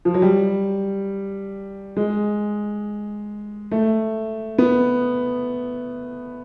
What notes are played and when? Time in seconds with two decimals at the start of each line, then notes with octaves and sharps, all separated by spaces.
0.05 F3
0.14 F#3
0.22 G3
1.97 G#3
3.71 A3
4.58 B3